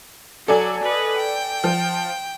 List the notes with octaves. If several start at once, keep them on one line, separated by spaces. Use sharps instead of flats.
F#3 A4 D5 G#5
B4 D#5
G5
F3